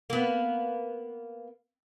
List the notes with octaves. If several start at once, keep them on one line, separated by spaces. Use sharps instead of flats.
A#3 B3